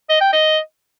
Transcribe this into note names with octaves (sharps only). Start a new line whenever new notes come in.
D#5
G5
D#5